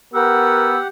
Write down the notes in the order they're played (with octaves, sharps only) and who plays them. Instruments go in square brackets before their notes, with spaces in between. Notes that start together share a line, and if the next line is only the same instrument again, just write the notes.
[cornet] B3 [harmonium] G4 F#5 [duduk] A#4 [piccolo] E6